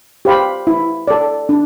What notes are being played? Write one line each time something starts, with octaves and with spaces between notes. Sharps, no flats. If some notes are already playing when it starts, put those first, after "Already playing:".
G4 C5 F5 B5
E4
A4 D5
D4